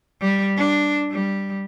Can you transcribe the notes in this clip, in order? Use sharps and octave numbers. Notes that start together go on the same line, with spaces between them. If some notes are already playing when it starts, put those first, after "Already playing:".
G3
D4
G3